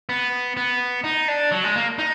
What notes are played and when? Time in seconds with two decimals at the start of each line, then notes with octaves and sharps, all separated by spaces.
0.09 B3
0.57 B3
1.04 D#4
1.28 D4
1.52 F#3
1.64 G#3
1.76 A#3
1.99 D#4